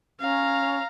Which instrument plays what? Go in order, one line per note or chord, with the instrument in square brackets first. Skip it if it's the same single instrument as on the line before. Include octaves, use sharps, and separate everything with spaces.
[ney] C#4 [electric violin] F5 A#5